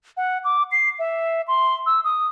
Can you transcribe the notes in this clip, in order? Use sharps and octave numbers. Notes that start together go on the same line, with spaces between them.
F#5
D6
C7
E5
C6
E6
D#6